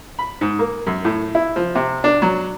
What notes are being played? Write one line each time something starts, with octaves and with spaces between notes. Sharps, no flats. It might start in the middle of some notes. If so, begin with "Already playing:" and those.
B5
G#2
A#3
F#2
A2
E4
F3
C3
D4
F#3